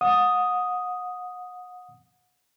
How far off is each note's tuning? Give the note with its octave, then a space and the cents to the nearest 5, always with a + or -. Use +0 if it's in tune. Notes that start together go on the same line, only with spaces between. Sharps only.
F#5 -30 D#6 +0